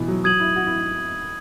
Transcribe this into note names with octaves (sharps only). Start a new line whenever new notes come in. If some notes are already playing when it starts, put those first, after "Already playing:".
Already playing: B2 E3
F#3
F#3 D#6 G#6 D#7 F#7
E4
F#4
E4